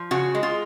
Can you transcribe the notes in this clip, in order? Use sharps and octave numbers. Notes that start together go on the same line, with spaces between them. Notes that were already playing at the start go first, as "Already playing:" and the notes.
Already playing: F3
C#3 F#4
G#3
F4